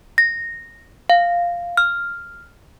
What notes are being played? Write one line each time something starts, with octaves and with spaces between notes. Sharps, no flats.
A#6
F5
F6